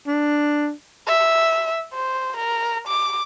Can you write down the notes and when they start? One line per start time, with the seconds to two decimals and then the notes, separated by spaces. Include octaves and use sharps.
0.06 D4
1.07 E5
1.94 C5
2.37 A#4
2.88 D6